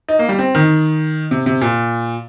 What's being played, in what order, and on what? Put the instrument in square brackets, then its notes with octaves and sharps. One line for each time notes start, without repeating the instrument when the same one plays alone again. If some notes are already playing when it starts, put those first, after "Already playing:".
[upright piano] D#4
A#3
G3
C4
D#3
C3
C3
A#2